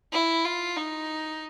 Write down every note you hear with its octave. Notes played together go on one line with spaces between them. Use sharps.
E4
F4
D#4